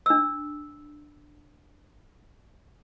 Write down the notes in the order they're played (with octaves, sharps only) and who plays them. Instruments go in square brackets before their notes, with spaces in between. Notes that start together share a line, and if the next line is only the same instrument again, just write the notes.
[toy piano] D4 E6